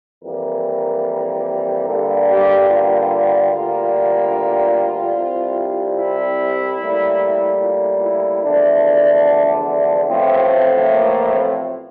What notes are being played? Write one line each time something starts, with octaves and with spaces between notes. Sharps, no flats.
F2 E3 G3 A#3 A#4
G2 D3 G3 A#3 A4
G4
F4
D2 D3 G3 A#3
C2 C3 G3
E4
A2 G3 A#3
F4
E4
E2 D3 F3 A3 D4
A1 A2 F3 A3 C4
C4
A#3
C4